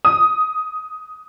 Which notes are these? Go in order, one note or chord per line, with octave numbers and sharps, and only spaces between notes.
D#6